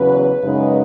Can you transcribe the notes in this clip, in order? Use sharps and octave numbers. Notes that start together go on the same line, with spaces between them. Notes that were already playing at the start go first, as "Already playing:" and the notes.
Already playing: E2 C#3 F#3 C#4 B4
F#2 C#3 G#3 D#4